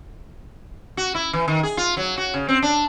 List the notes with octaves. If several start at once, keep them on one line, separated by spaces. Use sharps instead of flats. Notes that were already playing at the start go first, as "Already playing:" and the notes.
F#4
E4
E3
D#3
G#4
F4
F#3
F#4
C#3
C4
D4